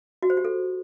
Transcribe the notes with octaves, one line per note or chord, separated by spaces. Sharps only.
F#4
C5
G4
A4